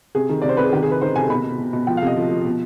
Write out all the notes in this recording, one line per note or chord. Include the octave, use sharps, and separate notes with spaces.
C3 G#4
D#3
C3 D5
C5
C3 B4
G#4
D#3 G4
G#4
C3 B4
D#3 C5
C3 G#5
B2 B5
B2
B2
B2
F3 G5
F5
C3 D#5
F3
F3
B2